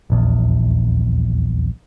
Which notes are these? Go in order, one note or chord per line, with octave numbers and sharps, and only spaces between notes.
D#1 A#1 E2